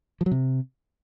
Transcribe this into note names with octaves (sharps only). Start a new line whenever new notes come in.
F3
F#3
C3